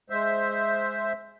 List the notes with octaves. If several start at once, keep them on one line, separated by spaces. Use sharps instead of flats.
G#3 C5 E5